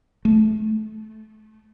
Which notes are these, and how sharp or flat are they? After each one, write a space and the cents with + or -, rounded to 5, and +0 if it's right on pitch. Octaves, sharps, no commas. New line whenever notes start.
A3 -25